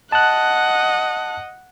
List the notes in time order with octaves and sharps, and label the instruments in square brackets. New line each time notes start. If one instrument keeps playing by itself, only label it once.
[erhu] D#5 [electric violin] F#5 [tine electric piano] A5 F#6